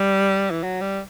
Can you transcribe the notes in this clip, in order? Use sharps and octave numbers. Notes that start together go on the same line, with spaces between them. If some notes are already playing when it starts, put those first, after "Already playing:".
Already playing: G3
E3
F#3
G3